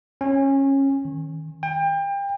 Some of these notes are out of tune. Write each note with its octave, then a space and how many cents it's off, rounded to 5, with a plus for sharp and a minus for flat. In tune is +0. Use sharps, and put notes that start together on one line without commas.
C#4 -20
D#3 +5
G5 +30